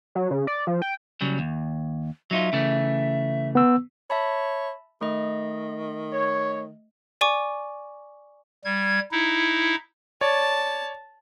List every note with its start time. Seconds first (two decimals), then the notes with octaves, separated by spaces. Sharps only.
0.15 F#3
0.31 C#3
0.47 D5
0.67 F3
0.82 G5
1.21 C#3 F#3 G3
1.39 D#2
2.31 F#3 D#4 F4 E5
2.53 C#3 E3 A3
3.55 B3 E6
4.10 C#5 E5 A5 B5
5.01 D#3 A3 D#5
6.13 C#5
7.21 D5 G#5 C#6 D6
8.65 G3 G#6
9.12 D#4 E4
10.21 C#5 D5 A5